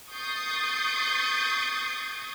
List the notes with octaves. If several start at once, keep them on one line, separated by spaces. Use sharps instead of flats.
C#6 D#6 G6 A6 C7